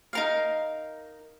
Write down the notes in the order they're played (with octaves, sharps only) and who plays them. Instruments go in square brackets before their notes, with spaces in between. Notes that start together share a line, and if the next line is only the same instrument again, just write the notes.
[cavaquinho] D#4 A#4 F5